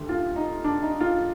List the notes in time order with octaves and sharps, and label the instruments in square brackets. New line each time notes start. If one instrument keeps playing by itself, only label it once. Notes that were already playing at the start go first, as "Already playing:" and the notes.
Already playing: [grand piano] D2 D3 G3
F4
D#4
D4
D#4
F4